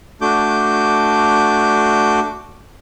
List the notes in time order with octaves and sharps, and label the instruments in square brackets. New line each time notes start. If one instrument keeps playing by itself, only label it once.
[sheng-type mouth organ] A3 D4 F#4 D6 G6